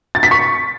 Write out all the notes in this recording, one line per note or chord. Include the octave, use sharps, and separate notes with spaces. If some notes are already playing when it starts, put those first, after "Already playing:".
A6
B6
C#6